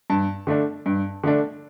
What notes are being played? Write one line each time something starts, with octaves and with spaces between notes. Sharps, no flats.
G2 A5
D3 A3 D4
G2
D3 A3 D4